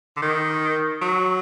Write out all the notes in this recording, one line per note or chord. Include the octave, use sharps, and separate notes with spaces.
D3
D#3
F#3